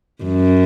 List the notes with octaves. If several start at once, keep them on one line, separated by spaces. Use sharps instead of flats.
F#2